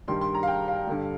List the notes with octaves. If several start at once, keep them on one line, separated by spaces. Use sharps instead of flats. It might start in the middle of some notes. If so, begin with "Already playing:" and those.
G2 D#3 G3 C6
C6
A#5
F5
G5
F5
G2 D3 G3